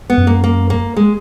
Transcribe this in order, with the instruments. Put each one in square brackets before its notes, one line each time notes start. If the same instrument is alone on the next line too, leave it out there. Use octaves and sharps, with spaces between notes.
[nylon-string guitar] B3
[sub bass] F#2
[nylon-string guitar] A#3
A#3
A#3
G#3